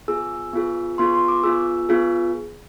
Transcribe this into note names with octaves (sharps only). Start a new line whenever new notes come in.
B3 F4 G#4 E6
B3 F4 G#4
B3 F4 G#4 C6
C6
D6
B3 F4 G#4 E6
B3 F4 G#4